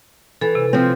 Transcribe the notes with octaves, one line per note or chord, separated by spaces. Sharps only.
E3 A4
C3
F3 C4